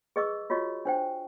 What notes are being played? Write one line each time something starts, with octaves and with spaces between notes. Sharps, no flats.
G#4 B4 D#5 C#6 D6 E6
F4 F#4 C#5 D#5 C#6
D4 C5 G5